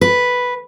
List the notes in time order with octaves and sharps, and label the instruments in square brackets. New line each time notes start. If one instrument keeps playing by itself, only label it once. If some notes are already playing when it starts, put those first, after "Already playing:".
[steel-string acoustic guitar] B4